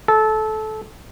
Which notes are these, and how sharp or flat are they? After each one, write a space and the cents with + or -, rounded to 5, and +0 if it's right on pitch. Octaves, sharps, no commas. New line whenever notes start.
A4 -20